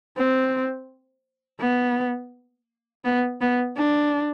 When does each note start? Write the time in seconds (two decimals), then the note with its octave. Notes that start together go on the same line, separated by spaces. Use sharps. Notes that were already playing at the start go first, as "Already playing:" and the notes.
0.17 C4
1.61 B3
3.05 B3
3.41 B3
3.77 D4